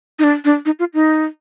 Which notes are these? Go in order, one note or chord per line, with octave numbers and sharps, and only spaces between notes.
D#4
D4
D4
D#4
F4
D#4